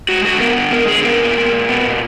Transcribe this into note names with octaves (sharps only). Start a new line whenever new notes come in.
G#3 F#4
D3 F#4
B3 A#4
D3
G#3 A#4
D3 G#4
B3 A#4
A#2
G#3
A#2
B3
A#2